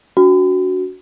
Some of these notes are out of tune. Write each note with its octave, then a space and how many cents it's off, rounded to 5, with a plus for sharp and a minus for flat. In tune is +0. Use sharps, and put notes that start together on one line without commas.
D4 -40 F#4 +0